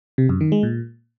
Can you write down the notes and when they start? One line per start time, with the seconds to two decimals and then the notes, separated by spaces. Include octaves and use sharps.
0.18 C3
0.29 F#2
0.41 D#3
0.52 G#3
0.63 A#2